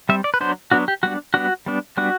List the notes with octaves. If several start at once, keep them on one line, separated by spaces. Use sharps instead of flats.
G3 C4 E5
D5
B4
F#3 B3 D4 C5
F#3 B3 D4 F#4
G4
G3 B3 D4 F#4
G3 B3 D4 F#4
G3 B3 D4
G3 B3 D4 F#4